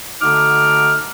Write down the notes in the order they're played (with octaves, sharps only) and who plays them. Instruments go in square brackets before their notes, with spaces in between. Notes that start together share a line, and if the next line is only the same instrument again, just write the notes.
[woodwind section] D3 A3 D#4 F#4 D6 F6